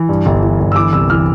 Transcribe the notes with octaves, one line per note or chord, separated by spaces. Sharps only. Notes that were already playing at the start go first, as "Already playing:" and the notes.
Already playing: E3
G2
G1
E3
G1
E6
E3 D6
C2 E6
E3 F6